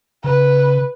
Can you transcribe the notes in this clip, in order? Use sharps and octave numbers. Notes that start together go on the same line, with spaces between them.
C#3 B4